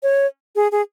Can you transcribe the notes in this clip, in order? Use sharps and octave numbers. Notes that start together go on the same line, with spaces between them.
C#5
G#4
G#4